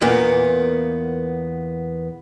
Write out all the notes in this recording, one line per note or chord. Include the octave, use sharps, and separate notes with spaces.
E2 A#2 A#3 B3